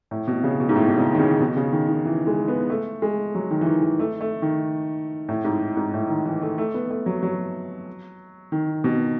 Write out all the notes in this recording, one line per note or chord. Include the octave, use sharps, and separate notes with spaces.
A2
B2
C#3
B2
G#2
A2
B2
C#3
D#3
C#3
B2
C#3
D#3
D#3
E3
G#3
B3
A3
G#3
F#3
D#3
E3
D#3
E3
A3
A3
D#3
A2
G#2
G#2
A2
D#3
E3
A3
A3
B3
A3
F#3
F#3
D#3
B2